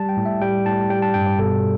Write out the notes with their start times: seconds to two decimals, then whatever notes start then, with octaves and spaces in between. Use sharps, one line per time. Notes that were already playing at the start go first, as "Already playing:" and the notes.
Already playing: G3 A5
0.09 G5
0.17 A2
0.26 E5
0.41 G3 G5
0.66 A2 A5
0.90 G3 G5
1.02 A5
1.14 G2 G5
1.27 D5
1.39 B2 A4